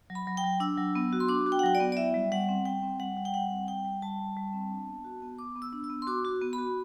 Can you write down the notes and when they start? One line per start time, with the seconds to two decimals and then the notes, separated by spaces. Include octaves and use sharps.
0.10 F#3
0.15 B5
0.27 F#3
0.37 G5
0.44 F#3
0.60 D4 E6
0.78 F#3
0.95 B3
1.13 F#4
1.20 C6
1.28 D4 D6
1.46 F#4
1.52 G5
1.59 F#5
1.63 F#3 G5
1.75 D5
1.80 B3
1.92 D5
1.97 E4 E5
2.14 G3
2.32 G3 F#5
2.49 C4
2.65 G3 G5
2.82 C4
3.00 G3 F#5
3.17 G3
3.25 G5
3.34 G3 F#5
3.50 C4
3.68 G3 G5
3.85 G3
4.02 G3 A5
4.19 G3
4.37 G3
4.54 C4
4.71 D4
4.88 B3
5.05 F#4
5.22 B3
5.39 B3 D6
5.56 B3
5.62 E6
5.73 D4
5.84 E6
5.90 B3
6.02 C6
6.07 F#4 D6
6.25 F#4
6.42 B3
6.53 B5
6.58 F#4